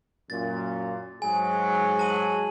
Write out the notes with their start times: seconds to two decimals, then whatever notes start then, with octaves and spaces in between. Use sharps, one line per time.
0.30 F#2 A#2 A6
1.22 G#2 F#3 G#4 G#5
1.99 A5 D#7 F#7